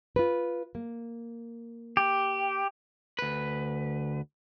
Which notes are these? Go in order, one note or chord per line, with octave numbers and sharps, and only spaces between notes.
F4 B4
A#3
G4
D2 B4